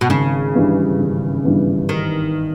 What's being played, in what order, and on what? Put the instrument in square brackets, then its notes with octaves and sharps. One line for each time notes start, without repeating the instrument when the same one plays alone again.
[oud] B2
[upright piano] G#1 [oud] C#3
[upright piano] G2 E3 G3
G#1
G2 E3 G3
[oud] D#3